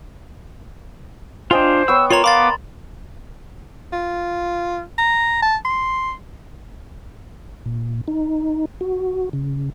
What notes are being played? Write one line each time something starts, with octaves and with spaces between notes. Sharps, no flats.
D4 F4 C5 D#5 G5 G#5
B3 C#5 G5 E6
F4 A#4 C#5 A#5 C6
B3 F5 B5 C6 D6 A6
F4
A#5
A5
C6
A#2
D#4
F#4
C#3